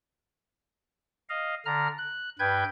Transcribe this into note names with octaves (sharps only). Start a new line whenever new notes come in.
D#5 F5
D3 A#5 F6
F#6
G2 B4 G5 G6 G#6